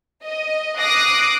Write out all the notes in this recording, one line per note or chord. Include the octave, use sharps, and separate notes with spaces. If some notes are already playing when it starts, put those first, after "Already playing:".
D#5
D6 D#6 F#6 A#6 C7